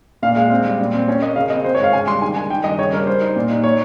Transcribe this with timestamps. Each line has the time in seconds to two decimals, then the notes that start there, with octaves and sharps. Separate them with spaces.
0.23 A#2 F5
0.36 G#3 F5
0.50 C4
0.65 G3
0.79 A#2
0.93 C4
1.08 C#4 C#5
1.22 A#3 D#5
1.36 C#3 F5
1.50 C4 D#5
1.64 C4 C5
1.75 C#5
1.79 G#2 F5
1.93 C#3 G#5
2.08 G3 C6
2.21 D#3 G#5
2.36 D#3 G#5
2.50 D#3 G5
2.64 G2 D#5
2.78 C#3 C#5
2.93 G3 A#4
3.07 G3 C5
3.21 D#4
3.36 A#2
3.50 D#4
3.64 C#5